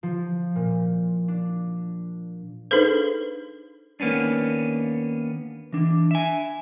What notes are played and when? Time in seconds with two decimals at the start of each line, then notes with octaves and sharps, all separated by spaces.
0.03 F3
0.56 A#2
1.28 D4
2.71 D4 D#4 G#4 A4 B4 C5
4.00 D#2 A#3 B3 C#4 D4
5.73 E3 D4
6.11 E5 G#5